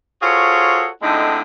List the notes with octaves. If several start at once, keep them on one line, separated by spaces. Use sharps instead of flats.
F4 F#4 G#4 A4 C5 C#5
A2 D3 G#3 C4 D#4